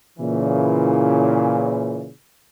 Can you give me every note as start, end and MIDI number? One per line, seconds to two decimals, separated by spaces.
0.18 2.10 46
0.18 2.10 49
0.18 2.10 52